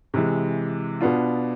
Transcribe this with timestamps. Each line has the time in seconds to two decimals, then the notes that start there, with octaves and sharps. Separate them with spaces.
0.14 C3 E3 G#3
1.01 B2 B3 D4 F4